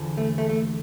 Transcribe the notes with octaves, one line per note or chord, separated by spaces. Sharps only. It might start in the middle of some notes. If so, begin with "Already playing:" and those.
Already playing: E2 D3 F3
A3
A3
A3